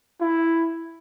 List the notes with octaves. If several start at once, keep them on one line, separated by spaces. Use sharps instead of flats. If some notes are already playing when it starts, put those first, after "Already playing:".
E4